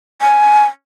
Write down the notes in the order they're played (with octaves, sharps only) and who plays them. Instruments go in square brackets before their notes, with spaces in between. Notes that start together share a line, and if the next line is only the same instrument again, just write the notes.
[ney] G#5